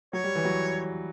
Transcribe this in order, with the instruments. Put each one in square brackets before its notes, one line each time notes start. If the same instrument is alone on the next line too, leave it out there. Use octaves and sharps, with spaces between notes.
[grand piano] F#3 [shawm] C#5
[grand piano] G3
E3
F#3